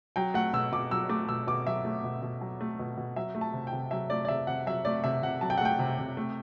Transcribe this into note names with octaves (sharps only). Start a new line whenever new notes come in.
F#3 G5
A3 F#5
B2 E6
B2 D6
F#3 E6
A3 D6
B2 E6
B2 D6
F#3 E5
A3
B2
B2
F#3
A3
B2
B2
F#3 E5
A3
A5
C3
G5
C3
F#3 E5
A3 D5
D5
C3 E5
C3 F#5
F#3 E5
A3 D5
C3 E5
C3 F#5
F#3 A5
G5
F#5
A3 G5
C3
C3
A3